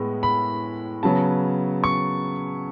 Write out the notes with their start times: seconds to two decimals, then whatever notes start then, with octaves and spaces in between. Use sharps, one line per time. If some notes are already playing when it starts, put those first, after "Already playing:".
Already playing: A2 G#3 B3
0.23 B5
1.03 C#3 F#3 B3 A5
1.84 C#6